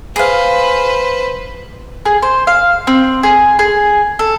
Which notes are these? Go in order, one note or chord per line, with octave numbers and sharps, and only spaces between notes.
G#4 B4 C5 F5
G#4
C5
F5
C4
G#4
G#4
A4